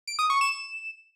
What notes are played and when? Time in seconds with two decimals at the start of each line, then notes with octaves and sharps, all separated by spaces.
0.07 D7
0.19 D#6
0.30 C#6
0.41 E7